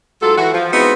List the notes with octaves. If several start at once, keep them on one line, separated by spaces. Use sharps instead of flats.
G#2 F#3 F4 A4
E3 F#4
F3
G#3 B3 C4 D#4 E4 F#4